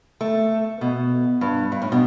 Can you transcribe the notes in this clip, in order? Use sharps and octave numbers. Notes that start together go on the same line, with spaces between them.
A3
B2
G2
G2
A2
B2